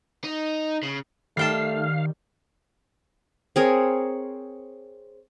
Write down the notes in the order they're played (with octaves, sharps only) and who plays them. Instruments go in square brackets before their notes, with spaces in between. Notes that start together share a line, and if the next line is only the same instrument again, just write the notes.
[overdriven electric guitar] D#4
C#3
[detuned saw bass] D#3 [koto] G3 G5 A5 [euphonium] A3 [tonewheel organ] F5
[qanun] C4 G#4 A#4 C#5